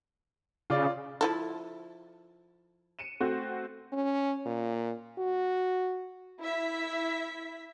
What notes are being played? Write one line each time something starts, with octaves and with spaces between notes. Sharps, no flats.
C#3 F4 D5
F3 E4 A4
C#7 D#7 E7
A3 C4 F#4
C#4
A#2
F#4
E4 E5 B6